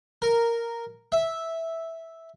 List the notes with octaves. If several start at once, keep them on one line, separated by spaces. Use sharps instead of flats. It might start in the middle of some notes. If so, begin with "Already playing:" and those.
A#4
E5